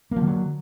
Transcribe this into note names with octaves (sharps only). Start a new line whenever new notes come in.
D3 F3 F#3 A#3